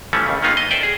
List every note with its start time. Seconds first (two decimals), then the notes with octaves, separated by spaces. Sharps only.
0.13 E3 F3 G3 A3 C#4
0.26 D#2 C#3
0.42 D#3 G#3 A#3 B3 D#4 F4
0.57 D#5
0.71 A4 C5 D5 E5 G5
0.83 G#4